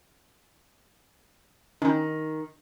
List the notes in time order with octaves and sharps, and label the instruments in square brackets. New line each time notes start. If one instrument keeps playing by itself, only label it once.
[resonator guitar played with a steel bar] D#3 [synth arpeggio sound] C#4 D#4